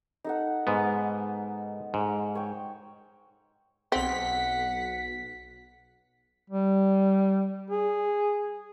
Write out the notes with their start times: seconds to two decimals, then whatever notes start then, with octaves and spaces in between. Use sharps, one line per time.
0.24 D#4 A4 F#5
0.67 G#2 B3
1.94 G#2
2.35 C#5 G5
3.92 B1 C4 F#5 B6
6.50 G3
7.70 G#4